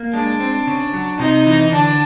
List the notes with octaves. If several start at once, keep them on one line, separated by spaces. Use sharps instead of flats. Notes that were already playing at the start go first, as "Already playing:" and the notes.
Already playing: A#3
G#3 D4
C4
C#3
F#3
C3 D#4
E3
D3 D4